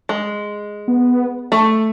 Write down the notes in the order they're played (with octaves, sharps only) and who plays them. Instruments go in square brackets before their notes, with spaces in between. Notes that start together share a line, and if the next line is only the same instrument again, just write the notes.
[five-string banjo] G#3
[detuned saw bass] B3
[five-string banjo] A3